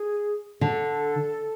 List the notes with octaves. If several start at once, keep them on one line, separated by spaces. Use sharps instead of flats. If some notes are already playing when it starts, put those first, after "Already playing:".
Already playing: G#4
D3 A4